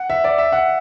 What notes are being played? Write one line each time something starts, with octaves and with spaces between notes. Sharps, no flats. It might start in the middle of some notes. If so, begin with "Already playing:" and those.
Already playing: F#5
E5
D5
E5
F#5